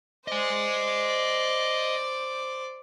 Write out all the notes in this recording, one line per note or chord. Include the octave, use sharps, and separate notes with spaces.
C5 D5 D#5 G#5